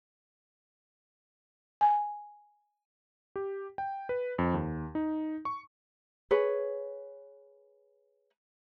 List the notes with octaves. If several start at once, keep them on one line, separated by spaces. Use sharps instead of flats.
G#5
G4
G5
B4
F2
D#2
D#4
C#6
G#4 B4 C#5